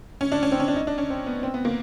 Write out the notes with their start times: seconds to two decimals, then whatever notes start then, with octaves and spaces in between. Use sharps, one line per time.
0.21 C#4
0.32 D4
0.43 C#4
0.52 C4
0.60 C#4
0.68 D4
0.76 D#4
0.87 D4
0.98 C#4
1.10 C4
1.26 B3
1.43 C4
1.54 B3
1.65 A#3